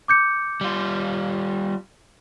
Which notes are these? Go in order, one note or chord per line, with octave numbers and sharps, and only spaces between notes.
D6 G6 C#7
G3 F4